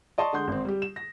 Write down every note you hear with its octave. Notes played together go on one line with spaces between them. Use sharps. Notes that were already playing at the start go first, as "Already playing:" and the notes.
D5 D#5 A5 C6 C#6 D#6
D3 G#3 F#5 C6 G6
G#1 C4
G3 G4
E7
A#6